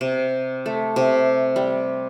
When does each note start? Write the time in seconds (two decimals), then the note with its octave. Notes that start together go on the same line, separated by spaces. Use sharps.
0.01 C3
0.66 A3
0.96 C3
1.56 G3